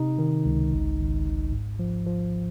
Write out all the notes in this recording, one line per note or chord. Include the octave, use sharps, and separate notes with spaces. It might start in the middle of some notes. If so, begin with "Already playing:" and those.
Already playing: C3 D#4
D#3
C#2
G#1
G#1
G#1
G#2
F3
F3